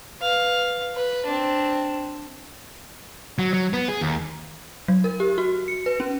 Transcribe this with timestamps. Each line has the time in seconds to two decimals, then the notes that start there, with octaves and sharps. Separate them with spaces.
0.21 B4 F5
0.95 B4
1.26 C4 D4
3.39 F#3
3.54 F#3
3.73 B3
3.88 G#4
4.01 D#2
4.88 F#3
5.04 A#4
5.20 G4
5.38 F#4
5.68 C#7
5.86 B4
6.00 C#4